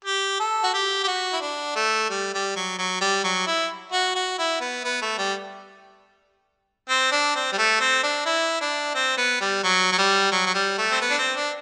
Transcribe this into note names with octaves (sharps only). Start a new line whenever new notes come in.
G4
A4
F#4
G4
G4
F#4
E4
D4
A3
G3
G3
F#3
F#3
G3
F#3
E4
F#4
F#4
E4
B3
B3
A3
G3
C4
D4
C4
G3
A3
C4
D4
E4
D4
C4
B3
G3
F#3
F#3
G3
F#3
F#3
G3
A3
C4
B3
D4
C4
D4